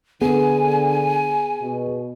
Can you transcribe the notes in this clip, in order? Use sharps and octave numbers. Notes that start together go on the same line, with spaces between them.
D3 B3 G#4 G#5
B2